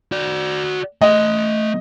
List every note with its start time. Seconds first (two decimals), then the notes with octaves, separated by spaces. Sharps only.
0.12 F#4 D5
1.01 A3 D#5 C6